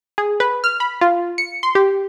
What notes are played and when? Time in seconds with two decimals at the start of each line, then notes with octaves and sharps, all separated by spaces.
0.18 G#4
0.40 B4
0.64 F6
0.80 B5
1.01 F4
1.38 C#7
1.63 C6
1.75 G4